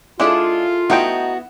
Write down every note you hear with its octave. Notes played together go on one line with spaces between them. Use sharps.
G#3 D4 E4 F4 G#4 A4 D5
A3 B3 D#4 E4 F#4 G5